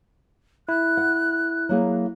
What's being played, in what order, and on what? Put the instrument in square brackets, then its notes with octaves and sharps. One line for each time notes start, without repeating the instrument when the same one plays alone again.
[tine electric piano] E4 [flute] F#6
[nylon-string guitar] F#5
F#3 A#3 G#4